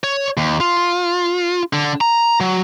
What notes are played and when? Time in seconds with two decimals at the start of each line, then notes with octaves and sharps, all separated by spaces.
0.04 C#5
0.37 D#2
0.60 F4
1.73 D3
2.01 A#5
2.40 F#3